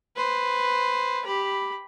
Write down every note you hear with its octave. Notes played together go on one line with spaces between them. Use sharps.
B4 C5
G4 B5